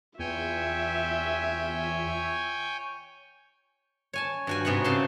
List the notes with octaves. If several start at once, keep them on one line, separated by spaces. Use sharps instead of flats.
E2 F4 C#5 E5 G5 G#5
C#5 G#5 A5
G2 F#4 G#5
G#2 C3 B3 C#5 F#5
C#3 A4 C5 F#5 A5 C6